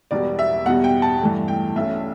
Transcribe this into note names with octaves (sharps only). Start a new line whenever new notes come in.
E1 E2 B2 G3 B3 D5
E5
E2 B2 G3 F#5
G5
A5
G2 E3 A3
G5
B1 B2 A3 C#4 E5